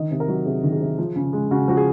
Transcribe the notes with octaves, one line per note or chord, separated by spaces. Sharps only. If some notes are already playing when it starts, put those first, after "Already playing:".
Already playing: D#3 D#5
C3
A#4
F#3
C3 G#4
D#3
G#4
C3
F3
C#3
G#3
C#3 F#4
F3 F#4
G#4